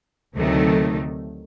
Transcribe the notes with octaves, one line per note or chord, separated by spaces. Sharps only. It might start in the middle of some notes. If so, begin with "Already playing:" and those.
D2 C3 D#3 F#3 A3